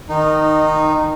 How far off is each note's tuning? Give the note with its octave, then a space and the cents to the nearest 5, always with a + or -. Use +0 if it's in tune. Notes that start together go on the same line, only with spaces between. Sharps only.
D#3 +0 D#4 -15